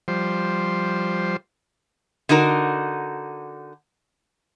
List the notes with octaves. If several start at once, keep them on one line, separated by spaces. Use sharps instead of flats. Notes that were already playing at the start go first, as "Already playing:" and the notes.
F3 G3 C5
D3 D#4 F#4 A#4